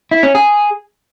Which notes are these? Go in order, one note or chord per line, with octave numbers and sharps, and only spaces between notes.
E4
C#4
G#4